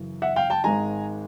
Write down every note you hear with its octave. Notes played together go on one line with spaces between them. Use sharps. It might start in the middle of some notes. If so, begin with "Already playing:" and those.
Already playing: F#2 C#3 E3
E5 F#5
F5 G5
G5 A5
G#1 G#2 D#3 G#3 G#5 A#5